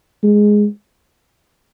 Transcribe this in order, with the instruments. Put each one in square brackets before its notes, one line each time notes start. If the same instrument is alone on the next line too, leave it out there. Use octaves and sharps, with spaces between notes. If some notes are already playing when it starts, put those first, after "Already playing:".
[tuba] G#3